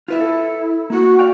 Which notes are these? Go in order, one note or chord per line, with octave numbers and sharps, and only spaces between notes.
E4 F4 B4 E5
A4
A#3 F#4
D5 F5 G5